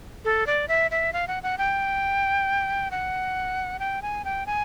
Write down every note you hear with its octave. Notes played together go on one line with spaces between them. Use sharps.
A4
D5
E5
E5
F5
F#5
F#5
G5
F#5
G5
G#5
G5
G#5